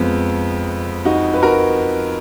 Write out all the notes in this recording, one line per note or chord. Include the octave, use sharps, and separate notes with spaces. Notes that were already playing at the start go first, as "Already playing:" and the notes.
Already playing: F2 F3 G#3 B3
D#4 F#4
B4
F#4 A#4